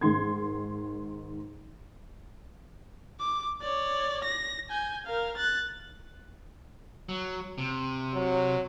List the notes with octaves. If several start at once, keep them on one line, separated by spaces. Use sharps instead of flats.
G#2 D#3 C6 G#6
D6
C#5 D5
A#6
G#5 G6
A#4 F5
F#6 A6
F#3
C3
F#3